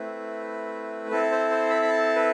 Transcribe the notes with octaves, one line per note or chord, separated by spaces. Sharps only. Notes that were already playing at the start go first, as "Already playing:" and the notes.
Already playing: A3 C4 E4 B4
C4 E4 A4
C5
C5
B5
B5
A5
B4